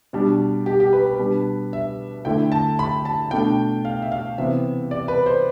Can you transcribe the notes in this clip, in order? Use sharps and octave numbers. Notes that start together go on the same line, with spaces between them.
B2 G3 D4
G4
G4
B4
B4
B2 G3 D4
E5
D3 A3 E4 G5
A5
B5
A5
B2 A3 D4 G5
F5
E5
F5
C3 E3 B3 E5
D5
B4
C5